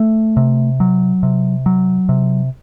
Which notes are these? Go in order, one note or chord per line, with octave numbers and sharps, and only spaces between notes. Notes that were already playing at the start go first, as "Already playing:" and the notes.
Already playing: A3
C3
F#3
C3
F#3
C3